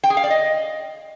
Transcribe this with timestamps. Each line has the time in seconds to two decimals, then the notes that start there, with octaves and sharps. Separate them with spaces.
0.04 G5
0.10 G#4
0.17 F5
0.24 D5
0.30 D#5